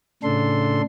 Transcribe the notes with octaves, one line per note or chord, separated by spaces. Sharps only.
A2 C#3 D4 A4 C6